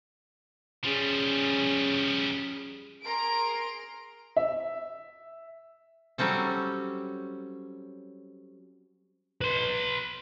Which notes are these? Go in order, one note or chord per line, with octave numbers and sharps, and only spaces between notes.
F3 G3 C#4 G#4
G#4 A#4 A#5 C6 D7
E5
F#3 G3 C4 C#4 A4
B4 C6